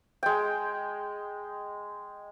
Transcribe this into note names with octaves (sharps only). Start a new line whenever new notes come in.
G#3 G5